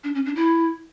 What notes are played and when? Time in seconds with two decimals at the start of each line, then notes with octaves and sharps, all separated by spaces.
0.04 D4
0.15 C#4
0.26 D4
0.36 E4